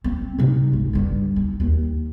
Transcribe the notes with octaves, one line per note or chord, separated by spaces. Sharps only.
C4
C3 D#4
G#1 C#2
G2 D3
D#4
D#2